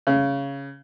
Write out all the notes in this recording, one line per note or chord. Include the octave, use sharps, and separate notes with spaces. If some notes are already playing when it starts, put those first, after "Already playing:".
C#3